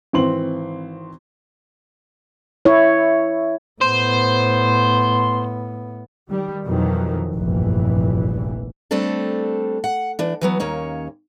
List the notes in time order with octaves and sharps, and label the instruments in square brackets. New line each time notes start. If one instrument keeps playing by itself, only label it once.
[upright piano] G#1 E3 C4 C6 F#7
[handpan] E4 C#5
[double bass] A2 B3 [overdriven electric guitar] C5
[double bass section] D#3 G3
F2 B2 D#3 E3 F#3
F1 A#1 G2 E3
[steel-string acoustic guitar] G3 A3 C4 D4 A4
F#5
E3 D4
E3 F#3 B3
D#2 A#3 C#4 C#5